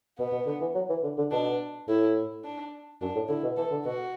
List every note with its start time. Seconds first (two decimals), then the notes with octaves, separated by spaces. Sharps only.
0.18 B2 B3
0.32 B2
0.46 D3
0.61 E3
0.75 F#3
0.89 E3
1.03 D3
1.18 D3
1.31 B2 D4
1.88 A2 E4
2.44 D4
3.01 F#2 D4
3.15 A2
3.28 D3 E4
3.43 B2
3.57 E3 A4
3.71 D3
3.85 B2 F#4